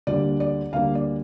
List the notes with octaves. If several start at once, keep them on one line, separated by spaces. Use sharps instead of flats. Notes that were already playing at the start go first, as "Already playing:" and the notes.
D2 D3 G3 A#3 D5
D5
D2 D3 G3 A#3 F5
D5